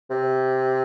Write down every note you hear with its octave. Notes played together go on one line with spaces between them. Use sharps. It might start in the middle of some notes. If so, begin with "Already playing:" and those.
C3